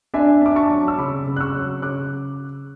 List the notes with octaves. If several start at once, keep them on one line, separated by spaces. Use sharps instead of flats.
D4 E5 G#5
D4 D6
A5 C#6
F#3
E6
C#3 B5 D6
C#3
F#6
C#6 E6
F#3
C#3 D6 F#6